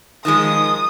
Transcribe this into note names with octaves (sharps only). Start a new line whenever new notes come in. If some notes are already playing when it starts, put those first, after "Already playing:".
D#3 F3 G#3 D#6